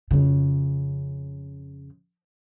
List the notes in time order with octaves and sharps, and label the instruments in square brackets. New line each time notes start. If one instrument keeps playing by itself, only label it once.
[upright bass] F2 C#3